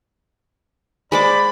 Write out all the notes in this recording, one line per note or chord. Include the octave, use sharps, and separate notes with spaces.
G#3 C5 D5 B5 D6